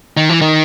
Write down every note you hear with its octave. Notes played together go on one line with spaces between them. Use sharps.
D#3
E3
D#3